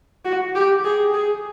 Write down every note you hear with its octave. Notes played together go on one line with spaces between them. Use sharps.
F#4
G4
G#4
G#4